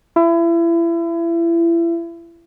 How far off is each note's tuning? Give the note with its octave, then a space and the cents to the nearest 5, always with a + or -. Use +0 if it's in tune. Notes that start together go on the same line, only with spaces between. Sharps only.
E4 +30